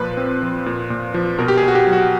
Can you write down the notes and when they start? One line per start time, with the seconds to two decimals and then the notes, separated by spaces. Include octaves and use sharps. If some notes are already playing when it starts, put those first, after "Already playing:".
Already playing: A#2 F3 B4
0.17 C4
0.42 F3
0.66 A#2
0.90 A#2
1.14 F3
1.38 B2 A#4
1.48 G4
1.57 G#4
1.63 B2
1.68 F#4
1.75 G4
1.87 F#3
1.93 F#4